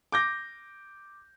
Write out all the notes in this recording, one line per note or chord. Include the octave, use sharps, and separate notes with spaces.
D6 G6 A#6